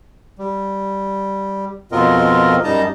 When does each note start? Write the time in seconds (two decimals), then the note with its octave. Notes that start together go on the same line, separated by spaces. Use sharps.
0.39 G3
1.92 F2 B2 C4 F4 A#4 D#5
2.64 F#2 G3 D#4 D#5 A5 A#5